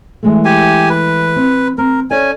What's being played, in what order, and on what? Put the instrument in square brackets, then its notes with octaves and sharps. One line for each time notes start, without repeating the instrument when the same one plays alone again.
[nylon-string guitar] E3 G#3 A3
[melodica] G4 G#5
B4
[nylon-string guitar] C4
[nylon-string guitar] C4 [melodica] A#4
[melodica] C#4 G#5 [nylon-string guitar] A4 C#5 D5